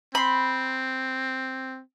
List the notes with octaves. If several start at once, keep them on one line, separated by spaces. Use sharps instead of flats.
C4 B5 C6